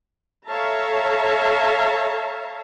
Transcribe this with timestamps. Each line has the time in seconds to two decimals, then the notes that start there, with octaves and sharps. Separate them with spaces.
0.47 A4 C#5 E5 F5 A5 A#5